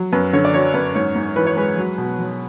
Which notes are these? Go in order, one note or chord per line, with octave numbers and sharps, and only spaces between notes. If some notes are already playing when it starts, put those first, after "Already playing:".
Already playing: F#3
F#2 B4
D3 C#5
D5
F#3 C#5
F#2 B4
G#2 C#5
G#2
E3 B4
C#5
G#3 B4
F#3
B2
F#3